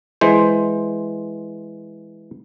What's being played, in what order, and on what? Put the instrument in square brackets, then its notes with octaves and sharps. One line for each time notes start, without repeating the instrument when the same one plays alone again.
[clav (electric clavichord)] E3 G#3 C5